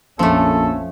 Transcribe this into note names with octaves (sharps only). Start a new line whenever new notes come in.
A#1 F2 F3 A3 C#4 A4